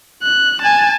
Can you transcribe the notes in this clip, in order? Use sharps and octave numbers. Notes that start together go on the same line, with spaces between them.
F#6
G#5 A5